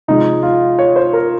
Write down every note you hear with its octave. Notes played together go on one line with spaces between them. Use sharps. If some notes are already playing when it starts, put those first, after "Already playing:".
C3 F3 G#3 D#4
F4
C#5
C5
A#4